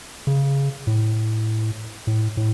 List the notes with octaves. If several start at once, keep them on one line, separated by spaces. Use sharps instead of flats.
C#3
A2
A2
A2